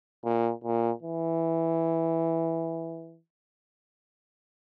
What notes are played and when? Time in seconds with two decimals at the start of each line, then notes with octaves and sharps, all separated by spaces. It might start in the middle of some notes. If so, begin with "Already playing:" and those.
0.25 A#2
0.64 A#2
1.03 E3